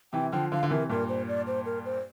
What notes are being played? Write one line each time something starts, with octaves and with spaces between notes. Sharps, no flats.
C3 E3 G5
D3 F3 G5
D3 F3 F5
D3
C3 E3 A#4
G2 A#2 A#4
C5
D5
C5
A#4
C5